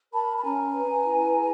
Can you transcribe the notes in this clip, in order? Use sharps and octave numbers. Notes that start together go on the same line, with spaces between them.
A#4 A5 B5
B5
C#4 G#5 A#5
B4
E4
G#4